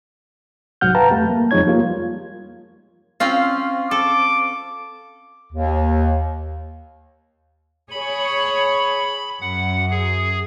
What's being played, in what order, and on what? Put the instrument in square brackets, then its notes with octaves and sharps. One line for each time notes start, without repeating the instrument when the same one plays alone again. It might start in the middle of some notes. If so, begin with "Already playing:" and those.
[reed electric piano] C2 G#2 F#3 F#5 F6 G6
B4 F5 G5 A5 A#5
F2 G3 A3
A#3
F2 F3 G#3 D#4 C#5 G#6
G3 A#3 F4
[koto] C4 C#4 F4 [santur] F5
[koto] A4 [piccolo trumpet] D6
[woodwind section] D#2
[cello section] G#4 C#5 [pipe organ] B5
[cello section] F#2 [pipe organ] F#5
[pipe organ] G#4